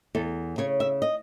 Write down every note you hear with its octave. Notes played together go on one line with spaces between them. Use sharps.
E2 A4
C#3 C#5
E5
D#5